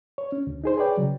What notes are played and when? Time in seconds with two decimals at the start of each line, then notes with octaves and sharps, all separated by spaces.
0.18 C#5
0.32 C#4
0.47 D2
0.64 D#4 G#4 C5
0.77 G#4 B4 C#5 D5 G5
0.97 C#3 F#3